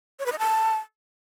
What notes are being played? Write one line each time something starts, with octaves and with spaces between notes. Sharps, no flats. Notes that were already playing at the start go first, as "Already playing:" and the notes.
C#5
B4
D#5
A5